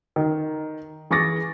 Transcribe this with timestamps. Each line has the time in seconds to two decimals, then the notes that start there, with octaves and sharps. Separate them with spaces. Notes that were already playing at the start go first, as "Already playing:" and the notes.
0.16 D#3
1.10 E3 G#4 C#6 D6 A6 A#6